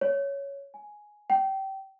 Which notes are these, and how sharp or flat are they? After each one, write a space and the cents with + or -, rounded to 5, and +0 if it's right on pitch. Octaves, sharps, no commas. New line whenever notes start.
C#5 +5
G#5 +5
G5 -25